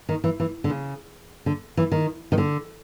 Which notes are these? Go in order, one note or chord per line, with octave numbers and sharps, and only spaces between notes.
D#3
E3
E3
D3
C#3
D3
E3
D#3
D#3
D3